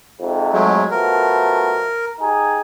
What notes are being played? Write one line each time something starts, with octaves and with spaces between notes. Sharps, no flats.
F2 G#2 C3
F#3 G#3 A3
B2 F3 A3 A#4
D#4 G4 G#4